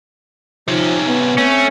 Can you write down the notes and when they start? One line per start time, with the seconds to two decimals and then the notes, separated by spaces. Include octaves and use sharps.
0.68 C3 F3 C#4 D#4
1.07 B3
1.38 A3 C4 C#4